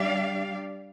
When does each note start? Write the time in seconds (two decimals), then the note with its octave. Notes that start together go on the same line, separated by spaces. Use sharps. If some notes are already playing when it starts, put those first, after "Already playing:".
Already playing: G3 D4 G4 D5 F5